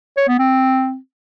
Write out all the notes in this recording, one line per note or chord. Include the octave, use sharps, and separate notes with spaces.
C#5
B3
C4